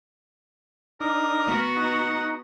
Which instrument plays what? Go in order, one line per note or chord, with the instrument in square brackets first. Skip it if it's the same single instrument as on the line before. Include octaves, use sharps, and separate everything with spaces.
[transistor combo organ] D4 D#4 [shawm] A#4
[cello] B3 F#4
[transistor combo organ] D#4 A#5 [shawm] F#5